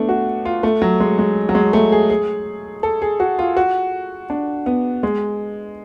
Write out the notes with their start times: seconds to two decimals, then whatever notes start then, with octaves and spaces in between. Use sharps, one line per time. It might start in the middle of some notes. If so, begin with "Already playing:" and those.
Already playing: A3 B3 D4
0.09 F#4
0.45 F4
0.63 A3
0.82 F#3
1.00 G#3
1.19 G#3
1.49 F#3
1.55 G#3
1.73 A3
1.92 G#4
2.10 G#4
2.83 A4
3.02 G#4
3.20 F#4
3.39 F4
3.57 F#4
4.30 D4
4.66 B3
5.03 G#3